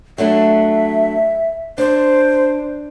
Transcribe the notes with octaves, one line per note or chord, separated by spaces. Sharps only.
F#3 A3 D4 E5
D4 C5